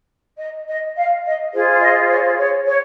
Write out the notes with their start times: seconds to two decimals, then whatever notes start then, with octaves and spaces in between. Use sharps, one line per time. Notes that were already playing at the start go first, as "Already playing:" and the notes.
0.39 D#5
0.68 D#5
0.97 F5
1.25 D#5
1.53 F4 G#4 C5
1.81 D#5
2.10 C#5
2.38 C#5
2.67 C#5